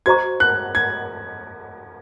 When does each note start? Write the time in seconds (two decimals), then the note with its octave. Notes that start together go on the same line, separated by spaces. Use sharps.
0.06 F#4 C5 D#5 A#5 C#6 G#6
0.40 F#6
0.75 G#6